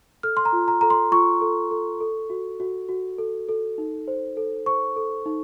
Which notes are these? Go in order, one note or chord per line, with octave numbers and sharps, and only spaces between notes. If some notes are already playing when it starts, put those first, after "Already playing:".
A4 F6
C6
A#5
F4
A#5
A4 A#5
C6
F4 C#6
A4
A4
A4
F#4
F#4
F#4
A4
A4
D#4
C5
A4
C5 C#6
A4
D#4